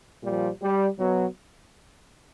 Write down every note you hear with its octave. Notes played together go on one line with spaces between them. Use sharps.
A#2 F3 G3
G3
B2 F#3